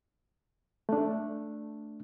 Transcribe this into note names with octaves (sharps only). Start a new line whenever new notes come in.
A3 D4